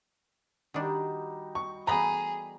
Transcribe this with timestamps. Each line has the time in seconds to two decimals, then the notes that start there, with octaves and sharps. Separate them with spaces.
0.74 D#3 G3 D4 D#4 F#4
1.55 C#6
1.87 E3 A3 B3 G#4 A#5 B5